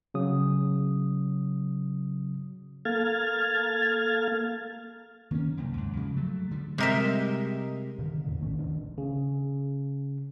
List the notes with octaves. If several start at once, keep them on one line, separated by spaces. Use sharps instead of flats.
C#3 F#3 D#6
A#3 A4 F5 F6 G#6 A6
D#3 A#3 B3 C#4
C2 F#2
D#2 G#2
C#3 F3 G#3
F#3 A3
D3 F#3 G3
C3 G3 G#3 A#4 D#5 E5
B2 D3 D#3
E2 A2 D3
A#1 D#3 A3 C#4
D#1 E2 D#3 D4
C#3